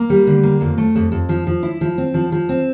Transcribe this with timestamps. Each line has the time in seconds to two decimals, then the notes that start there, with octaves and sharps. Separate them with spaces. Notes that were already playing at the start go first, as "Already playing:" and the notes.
Already playing: A#3
0.10 G3
0.27 D3
0.43 A#3
0.61 F2
0.78 A3
0.96 F2
1.12 F2
1.29 F3
1.47 F3
1.63 E4
1.81 F3
1.98 C4
2.14 F3
2.32 F3
2.49 C4